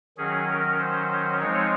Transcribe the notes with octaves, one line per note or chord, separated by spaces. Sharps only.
D#3 F#3 C#4 G#4
A#4
C5
F3 G#3 C4 D#4 C#5